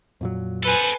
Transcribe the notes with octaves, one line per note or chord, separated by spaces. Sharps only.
F2 A#2 F#3
A4 B4 C5 G#5